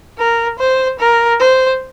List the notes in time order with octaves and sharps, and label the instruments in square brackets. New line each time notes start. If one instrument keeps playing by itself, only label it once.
[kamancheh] A#4
C5
A#4
C5